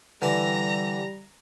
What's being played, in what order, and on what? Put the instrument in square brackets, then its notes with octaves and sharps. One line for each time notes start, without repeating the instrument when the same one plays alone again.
[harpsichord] D3 E3 A5 [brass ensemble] G3 [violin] A#5 A#6